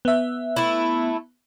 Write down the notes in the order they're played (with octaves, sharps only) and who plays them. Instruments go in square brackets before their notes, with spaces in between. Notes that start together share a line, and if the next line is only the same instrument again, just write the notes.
[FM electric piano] B3 E5
[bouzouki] A3 E4